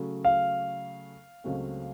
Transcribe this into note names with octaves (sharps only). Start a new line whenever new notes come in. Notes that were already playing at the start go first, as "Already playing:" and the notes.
Already playing: C#3 F#3 A3
F5
C#2 C#3 F#3 A3 C4